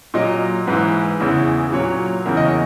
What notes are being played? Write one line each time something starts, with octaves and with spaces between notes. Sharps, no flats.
A#2 F#3 D#5
G#2 E3 B4
E2 C#3 E3
A#2 F#3 C#5
E2 C#3 E3 A#4
D#5
C#5